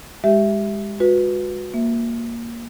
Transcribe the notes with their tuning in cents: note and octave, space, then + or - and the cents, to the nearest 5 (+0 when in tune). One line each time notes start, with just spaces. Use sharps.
G#3 -20 G4 -10 E5 +0
F#4 -25 B4 +0
A#3 +0 E5 +0